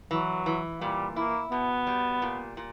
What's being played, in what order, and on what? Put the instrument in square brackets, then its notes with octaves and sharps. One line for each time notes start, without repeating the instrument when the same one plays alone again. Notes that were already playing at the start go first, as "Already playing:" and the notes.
[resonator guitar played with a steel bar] E3 [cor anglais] F#3
[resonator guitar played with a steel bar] E3
[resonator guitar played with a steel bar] A#2 [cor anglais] G3
[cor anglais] A#3 [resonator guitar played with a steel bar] E4
[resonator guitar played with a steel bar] B2 [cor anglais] B3
[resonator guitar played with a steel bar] G3
A#2
A#2